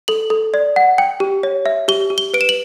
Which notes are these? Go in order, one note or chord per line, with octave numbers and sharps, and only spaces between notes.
A4 F#7
A4
D5
F#5
G5
G4
C#5
E5
G4 G7
G4
G7
B4 D7
E7
F#7